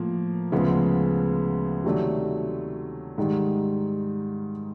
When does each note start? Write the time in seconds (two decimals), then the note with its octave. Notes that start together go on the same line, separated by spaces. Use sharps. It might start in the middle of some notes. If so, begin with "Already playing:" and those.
Already playing: A2 F3 A#3
0.52 D2 C#3 F3 G#3 B3
1.84 C3 D#3 F#3 A3 D4
3.18 G#2 D#3 G3